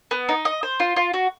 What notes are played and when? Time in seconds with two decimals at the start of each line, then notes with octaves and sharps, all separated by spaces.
0.11 B3
0.29 D#4
0.45 D#5
0.63 C5
0.80 F4
0.96 F4
1.14 F#4